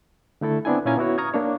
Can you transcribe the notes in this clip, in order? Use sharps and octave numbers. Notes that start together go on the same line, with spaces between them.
D3 A3 E4 A4
B3 C4 D4 E4 G#5
A#2 C#4 E4 F5 G#5 A#5
B3 E4 F#4 C#5
A#5 C#6 D#6 F6 G#6
A#3 D4 C#5